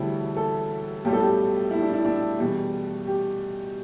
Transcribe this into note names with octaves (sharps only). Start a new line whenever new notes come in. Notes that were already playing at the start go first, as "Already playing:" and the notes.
Already playing: E1 D2 D3 G3 E4
A4
B1 A2 G3 G4
A4
G4
E4
D4
E4
D4
E2 B2 G3
G4